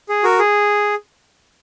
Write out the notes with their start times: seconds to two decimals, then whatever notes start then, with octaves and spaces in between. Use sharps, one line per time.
0.09 G#4
0.23 F#4 A#4
0.39 G#4